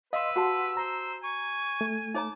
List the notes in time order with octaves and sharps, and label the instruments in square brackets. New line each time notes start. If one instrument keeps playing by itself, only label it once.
[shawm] B4 [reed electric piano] D#5 C6 [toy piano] F5 [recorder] E6
[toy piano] F#4 G4 A5 [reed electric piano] F#5 C6
[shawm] C5 [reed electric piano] A#5
[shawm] G#5 [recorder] C#6
[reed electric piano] A3
[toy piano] D#4 C#5 A#5 [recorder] D6